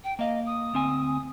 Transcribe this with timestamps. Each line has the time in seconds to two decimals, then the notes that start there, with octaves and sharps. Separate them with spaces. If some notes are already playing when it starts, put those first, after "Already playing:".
0.04 G5
0.19 A#3 D#5 F5
0.46 D#6
0.74 D2 C4 G#5